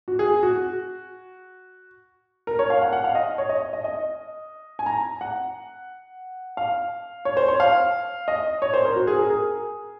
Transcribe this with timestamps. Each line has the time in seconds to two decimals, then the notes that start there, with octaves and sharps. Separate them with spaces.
0.08 F#4
0.19 G#4
0.43 F#4
2.47 A#4
2.59 C#5
2.70 F5
2.81 F#5
2.93 F#5
3.04 F5
3.15 D#5
3.38 C#5
3.49 D#5
3.73 D#5
3.84 D#5
4.79 G#5
4.86 A#5
5.21 F#5
6.57 F5
7.25 C#5
7.37 C5
7.48 C#5
7.60 F5
8.28 D#5
8.62 C#5
8.74 C5
8.85 A#4
8.96 F#4
9.07 G#4
9.19 A#4
9.30 G#4